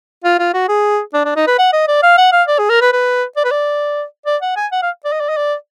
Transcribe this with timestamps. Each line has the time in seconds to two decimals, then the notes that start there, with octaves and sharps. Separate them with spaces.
0.24 F4
0.39 F4
0.54 F#4
0.69 G#4
1.14 D4
1.25 D4
1.36 D#4
1.47 B4
1.59 F#5
1.73 D#5
1.88 D5
2.03 F5
2.18 F#5
2.32 F5
2.48 D5
2.59 G#4
2.70 A#4
2.81 B4
2.93 B4
3.37 D5
3.44 B4
3.51 D5
4.26 D5
4.42 F#5
4.56 G#5
4.72 F#5
4.82 F5
5.05 D5
5.12 D#5
5.20 D5
5.29 D#5
5.37 D5